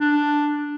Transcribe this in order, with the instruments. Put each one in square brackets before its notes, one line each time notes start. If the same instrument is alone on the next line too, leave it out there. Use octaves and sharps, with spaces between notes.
[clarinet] D4